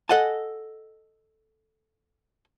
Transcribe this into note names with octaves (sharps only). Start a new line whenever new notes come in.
A4 D#5 F#5 G#5 A5